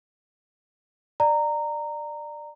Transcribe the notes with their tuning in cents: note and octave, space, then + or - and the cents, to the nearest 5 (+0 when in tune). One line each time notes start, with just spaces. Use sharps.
D5 +15 A#5 -15